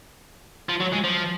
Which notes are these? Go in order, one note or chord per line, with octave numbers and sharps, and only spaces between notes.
F3
F#3
G#3
F3